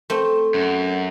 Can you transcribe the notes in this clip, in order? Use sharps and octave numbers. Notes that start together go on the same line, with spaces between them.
A3 C4
F#2